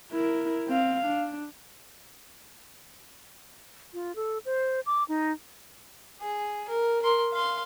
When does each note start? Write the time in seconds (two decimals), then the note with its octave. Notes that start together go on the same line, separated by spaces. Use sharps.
0.12 E4 A#4
0.68 C4 F5
1.06 D4
3.94 F4
4.16 A4
4.45 C5
4.86 D6
5.08 D#4
6.21 G#4
6.68 A#4
7.02 A#4 C6
7.32 F5 C6